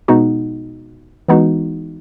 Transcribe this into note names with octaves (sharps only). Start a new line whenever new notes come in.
B2 G#3 B3 D#4 F#4
E3 G#3 B3 D#4 F#4